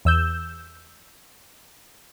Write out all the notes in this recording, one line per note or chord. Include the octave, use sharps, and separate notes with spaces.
E2 E6 G6